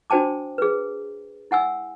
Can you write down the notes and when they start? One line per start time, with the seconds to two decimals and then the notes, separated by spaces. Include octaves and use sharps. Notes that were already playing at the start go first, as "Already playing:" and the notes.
0.10 D4 F#4 C5 G5 A5 D6
0.58 G#4 B4
1.51 E4 F#5 G#5 E6